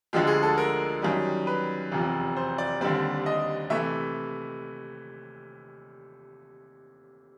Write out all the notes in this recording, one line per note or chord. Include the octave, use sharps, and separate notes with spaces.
D2 D3 F3 G#3 G4
G#4
A4
A#4
F#2 D#3 G3
B4
F1 E2 C3 F3
C5
D5
D#2 D3 G3 C4 D5
D#5
C3 E3 A3 E5